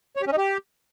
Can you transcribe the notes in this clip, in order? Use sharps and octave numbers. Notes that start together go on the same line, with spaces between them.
C#5
G4
C#4
D#4
G4